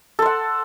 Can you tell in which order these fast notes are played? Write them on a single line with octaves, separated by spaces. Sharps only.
A4 C5 F#5